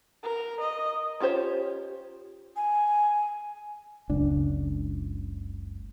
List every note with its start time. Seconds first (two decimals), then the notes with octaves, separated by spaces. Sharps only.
0.23 A#4
0.61 D#5
1.20 C#4 F4 G4 C5 C#5
2.56 G#5
4.10 F#1 C#2 D4